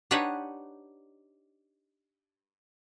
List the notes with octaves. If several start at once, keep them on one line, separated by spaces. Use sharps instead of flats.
D4 D#4 G4 B4 C#5 F#5